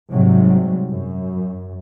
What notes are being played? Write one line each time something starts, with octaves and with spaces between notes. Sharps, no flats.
G#2 C3 F#3 G3
F#2